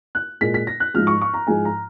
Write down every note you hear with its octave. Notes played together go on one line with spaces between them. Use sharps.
F#6
A#2 G#3 B6
B6
A#6
F#6
G#2 F3 G#3 F6
C#6
C#6
A#5
G#2 F3 G#3 G#5
A#5